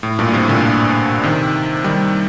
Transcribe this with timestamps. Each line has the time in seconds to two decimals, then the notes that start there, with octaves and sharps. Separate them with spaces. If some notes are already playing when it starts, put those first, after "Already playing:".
0.03 A2
0.19 G2 A#2
0.33 A2 C3
0.48 A#2 D3
1.24 C3 D#3
1.84 D#3 G3